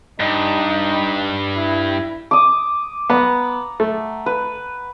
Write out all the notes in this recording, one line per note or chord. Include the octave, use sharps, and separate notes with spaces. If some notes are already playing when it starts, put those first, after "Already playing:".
G2 D#4
E4
D6 D#6
B3 F#5 A#5
A3
B4